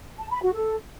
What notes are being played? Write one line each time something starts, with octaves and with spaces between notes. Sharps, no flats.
A5
B5
F#4
A4